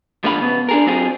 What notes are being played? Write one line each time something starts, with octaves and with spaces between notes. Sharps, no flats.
C#2 A#2 D3 F3 F5 B5
C#3 B3
D4 G#4 A#4
F#3 C4 F4 G#4